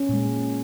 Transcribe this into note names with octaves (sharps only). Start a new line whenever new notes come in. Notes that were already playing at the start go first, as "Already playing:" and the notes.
Already playing: C#4
A#2 G#3